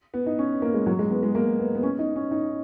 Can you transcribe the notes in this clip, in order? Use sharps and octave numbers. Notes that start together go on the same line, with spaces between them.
B3
D#4
C#4
A#3
G#3
F#3
G#3
B3
G#3
A#3
B3
B3
C#4
D#4
C#4
D#4